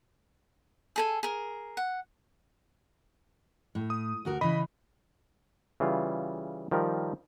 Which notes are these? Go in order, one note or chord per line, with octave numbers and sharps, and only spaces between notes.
G#4 A4 G#5
G#4 A#4
F#5
A2
D#6
D2 F#4 A#4
C#3 E3 D#5 B5
C#3 E3 G3 F4
D#3 F3 G3 A#4